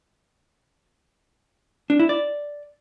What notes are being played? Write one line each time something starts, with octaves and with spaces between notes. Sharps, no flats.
D4
E4
D5